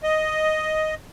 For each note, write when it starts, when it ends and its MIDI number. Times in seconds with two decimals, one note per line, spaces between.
0.03 0.95 75